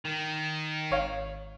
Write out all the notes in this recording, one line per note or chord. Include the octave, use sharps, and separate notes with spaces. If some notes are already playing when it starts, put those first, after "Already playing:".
D#3
G#1 C#5 F5